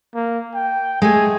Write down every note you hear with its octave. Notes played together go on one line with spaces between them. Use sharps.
A#3
G5
G#3 A3 G#5